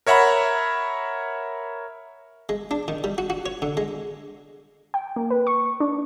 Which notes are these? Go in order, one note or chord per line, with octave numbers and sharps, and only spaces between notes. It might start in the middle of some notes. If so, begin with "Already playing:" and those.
A#4 C#5 E5 F#5 A#5 B5
G#3
D4
D#3
G3
F#4
F#4
C#5
D3
G#3
G5
A#3
B4
C#6
D4